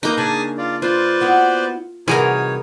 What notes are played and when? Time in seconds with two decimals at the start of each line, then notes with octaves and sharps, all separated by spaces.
0.03 A#3 D#4 B4 A#5 G6
0.17 C#3 D4 G#4 G#5 A5
0.58 F4 D5
0.82 F4 B4 C5 D5
1.21 B3 E4 F#4
2.08 C3 E3 G3 D#4 F#4 G#4 A#4 C#5